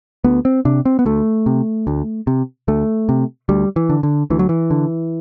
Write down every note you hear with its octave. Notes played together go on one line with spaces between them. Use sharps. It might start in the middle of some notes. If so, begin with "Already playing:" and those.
D2 B3
C4
C3 D4
C4
B3
D2 A3
C3
D2
C3
D2 A3
C3
D2 G3
E3
D3
D3
D2 E3
F#3
E3
D3